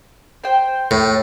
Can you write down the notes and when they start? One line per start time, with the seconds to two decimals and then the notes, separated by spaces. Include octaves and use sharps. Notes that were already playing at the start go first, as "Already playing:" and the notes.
0.44 C5 G5
0.91 A2 A3